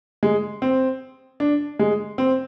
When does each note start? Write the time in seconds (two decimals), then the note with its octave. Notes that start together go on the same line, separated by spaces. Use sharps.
0.23 G#3
0.62 C4
1.40 D4
1.79 G#3
2.18 C4